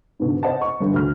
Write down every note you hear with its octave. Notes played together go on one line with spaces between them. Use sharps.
G#2 B2 D3
C5 D#5 F#5 A5
C#6
G1 G2
D2 F6